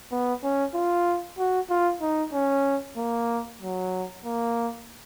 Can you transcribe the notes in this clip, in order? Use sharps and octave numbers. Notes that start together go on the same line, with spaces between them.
B3
C#4
F4
F#4
F4
D#4
C#4
A#3
F#3
A#3